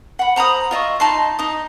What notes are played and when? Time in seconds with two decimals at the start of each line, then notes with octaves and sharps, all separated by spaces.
0.19 F#5 B5
0.36 C5 A#5 B5 D#6
0.71 F4 D#5 E5 C#6
1.00 D#4 A5 B5 C6
1.39 D#4 D#6